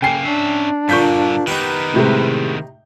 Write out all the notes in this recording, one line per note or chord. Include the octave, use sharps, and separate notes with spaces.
C#3 A#3 G5 G#5 C7
C#4 D4 E5
G2 A#2 D3 F3 C#6 G6 B6
D#3 B3 D#4 G4 B4
A2 C3 G#3